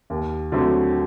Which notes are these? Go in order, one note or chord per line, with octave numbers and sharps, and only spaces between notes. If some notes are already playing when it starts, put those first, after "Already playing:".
D#2
D3 F#3 A3 C4